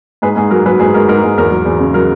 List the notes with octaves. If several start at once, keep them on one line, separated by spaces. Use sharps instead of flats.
G#2 G#4 B4
G#2 G#4
F#3 A#4
F#3 G#4 B4
G#2 G#4 B4
G#2 A#4
G#2 A#4
G#2 G#4
E2 A#4
F#3
E2
C#3
F#3 A#4